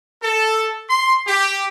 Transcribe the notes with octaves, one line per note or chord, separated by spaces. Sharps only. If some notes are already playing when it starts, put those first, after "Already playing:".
A4
C6
G4